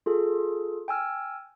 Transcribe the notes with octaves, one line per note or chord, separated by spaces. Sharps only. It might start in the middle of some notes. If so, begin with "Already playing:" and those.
F4 G#4 A4
G5 G#5 E6 F6